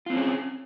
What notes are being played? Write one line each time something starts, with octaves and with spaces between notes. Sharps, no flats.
C4 C#4 F4 G#4